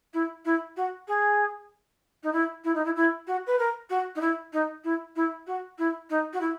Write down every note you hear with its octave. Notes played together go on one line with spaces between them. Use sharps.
E4
E4
F#4
G#4
D#4
E4
E4
D#4
E4
E4
F#4
B4
A#4
F#4
D#4
E4
D#4
E4
E4
F#4
E4
D#4
F#4
E4